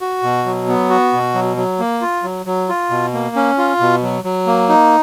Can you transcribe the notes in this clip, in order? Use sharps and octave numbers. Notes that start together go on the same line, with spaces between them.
F#4
B2
F#3
B3
F#4
B2
F#3
F#3
A#3
F4
F#3
F#3
F4
B2
A#3
C#4
F4
B2
F#3
F#3
A#3
D#4